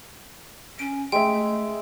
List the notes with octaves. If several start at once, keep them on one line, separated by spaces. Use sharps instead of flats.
C#4 D7
G#3 A3 E5 G5